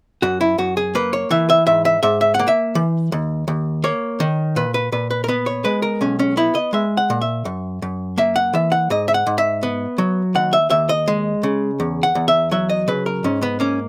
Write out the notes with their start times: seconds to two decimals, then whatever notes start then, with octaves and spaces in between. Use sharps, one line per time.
0.22 F#2 F#4
0.41 E4
0.58 F#2 F#4
0.77 G#4
0.95 A#3 B4
1.13 C#5
1.31 E3 E5
1.50 E5
1.67 G#2 E5
1.85 E5
2.03 G#2 E5
2.21 E5
2.34 A#3 F#5
2.48 E5
2.75 E3
3.12 D#2
3.48 D#2
3.84 A#3 C#5
4.20 D#3
4.56 A#2 B4
4.74 B4
4.92 A#2 B4
5.11 B4
5.24 A#4
5.28 B3 B4
5.46 C#5
5.65 G#3 B4
5.82 A#4
6.01 B1 C#4
6.19 C#4
6.37 B3 E4
6.55 D#5
6.73 G#3 E5
6.97 F#5
7.10 A#2
7.21 E5
7.45 F#2
7.82 F#2
8.18 A#3 E5
8.36 F#5
8.53 E3 E5
8.72 F#5
8.90 G#2 D#5
9.08 E5
9.14 F#5
9.27 G#2
9.38 E5
9.63 B3
9.98 F#3
10.35 D#2 F#5
10.53 E5
10.70 D#2 E5
10.89 D#5
11.08 G#3
11.43 C#3
11.80 E2
12.03 F#5
12.15 E2
12.28 E5
12.51 F#3 E5
12.70 D#5
12.88 C#3 B4
13.06 A#4
13.24 G#2 C#4
13.42 B3
13.60 A#3 C#4